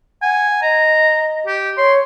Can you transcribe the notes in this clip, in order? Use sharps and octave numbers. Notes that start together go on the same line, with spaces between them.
F#5 G#5
D#5 A#5
G4
C#5 C6